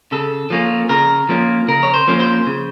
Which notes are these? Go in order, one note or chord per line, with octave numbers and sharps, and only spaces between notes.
C#3 A4
F3 A#3 C#4
C#3 A#4
F3 A#3 C#4
C#3 A#4
C#5
C5
F3 A#3 C#4
C5
C#3